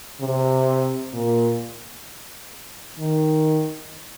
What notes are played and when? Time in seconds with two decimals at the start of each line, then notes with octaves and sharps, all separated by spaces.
0.20 C3
1.13 A#2
2.99 D#3